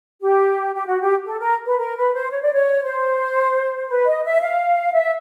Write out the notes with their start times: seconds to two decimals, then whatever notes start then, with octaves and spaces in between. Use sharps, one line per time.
0.22 G4
0.74 G4
0.87 F#4
1.00 G4
1.26 A4
1.40 A#4
1.66 B4
1.79 A#4
1.97 B4
2.14 C5
2.31 C#5
2.42 D5
2.54 C#5
2.84 C5
3.88 B4
4.06 D#5
4.24 E5
4.42 F5
4.94 E5